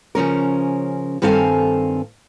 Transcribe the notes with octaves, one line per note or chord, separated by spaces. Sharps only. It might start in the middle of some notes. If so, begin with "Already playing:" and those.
C#3 F3 C#4 A#4
G2 D#3 C4 A4 F5 G#5